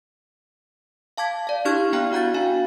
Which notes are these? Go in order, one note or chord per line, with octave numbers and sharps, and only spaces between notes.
F5 A5 D6 G#6 B6
D5 F5
D4 E4 G4 C#6 F6 G#6
B3 E4 F5 G5 A#5 F#6
F#4 F#5 A#5 G6 A6
D4 F#4 F5 G#5